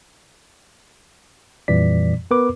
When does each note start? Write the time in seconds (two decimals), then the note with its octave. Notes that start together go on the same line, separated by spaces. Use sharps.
1.68 F2 A#2 E3 G3 D5 B6
2.31 B3 A#4 B4 D6